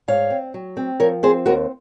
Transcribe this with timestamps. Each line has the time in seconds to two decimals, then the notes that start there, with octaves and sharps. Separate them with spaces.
0.08 G#2 C#5 F5
0.30 C4
0.54 F#3
0.77 C4
1.00 F3 A#4 C#5
1.23 C4 G#4 C5
1.46 D#2 F#4 A#4